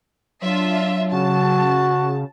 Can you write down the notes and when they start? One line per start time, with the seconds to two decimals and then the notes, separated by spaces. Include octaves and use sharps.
0.42 F#3 D4 F4 E5
1.12 C#3 F#4 A5